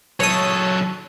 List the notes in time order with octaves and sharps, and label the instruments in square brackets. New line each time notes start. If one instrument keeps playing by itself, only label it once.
[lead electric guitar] F#3 A4 [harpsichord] C#5 D#6